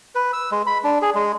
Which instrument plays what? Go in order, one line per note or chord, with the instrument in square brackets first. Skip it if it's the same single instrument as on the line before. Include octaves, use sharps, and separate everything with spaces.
[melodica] B4
E6
G#3
B5
D4
G#4
G#3